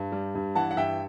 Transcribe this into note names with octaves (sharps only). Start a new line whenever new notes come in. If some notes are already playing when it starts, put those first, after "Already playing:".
Already playing: G2
G3
G2
E3 F#5 A5
F#5
G2 E5 G5